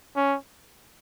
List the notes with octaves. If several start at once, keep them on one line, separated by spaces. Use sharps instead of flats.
C#4